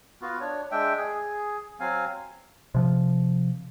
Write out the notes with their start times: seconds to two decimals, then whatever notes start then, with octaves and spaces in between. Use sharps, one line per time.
0.22 B3 F4 F#4
0.41 D4 C#5
0.71 G#3 D4 E5 G5
0.97 G#4
1.80 F#3 C4 F5 G#5
2.75 C3 F3